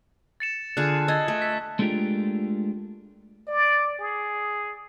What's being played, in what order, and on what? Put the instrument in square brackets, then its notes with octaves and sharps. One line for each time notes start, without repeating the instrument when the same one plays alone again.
[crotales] A6 C#7 E7
[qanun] D3 F4 G#4 [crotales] F#6
[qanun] D#5 [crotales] E6 G#6 A6
[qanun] A3
[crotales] B6
[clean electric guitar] G#3 A3 D4 F4 G4 A#4
[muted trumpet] D5
G#4